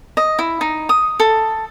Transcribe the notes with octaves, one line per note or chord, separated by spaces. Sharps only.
D#5
E4
D#4
D#6
A4